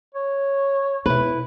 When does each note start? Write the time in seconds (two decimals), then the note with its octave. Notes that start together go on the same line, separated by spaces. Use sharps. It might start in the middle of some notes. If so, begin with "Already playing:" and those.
0.15 C#5
1.06 B2 E4 B4